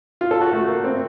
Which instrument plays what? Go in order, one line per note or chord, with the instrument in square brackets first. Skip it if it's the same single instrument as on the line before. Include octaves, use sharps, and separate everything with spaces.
[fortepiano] F4
A4
F#4
A3
A#3
C4